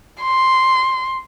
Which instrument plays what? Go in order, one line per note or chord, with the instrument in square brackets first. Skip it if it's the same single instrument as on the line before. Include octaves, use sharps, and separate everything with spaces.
[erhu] C6